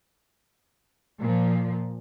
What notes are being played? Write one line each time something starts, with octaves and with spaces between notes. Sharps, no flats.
A#2 F3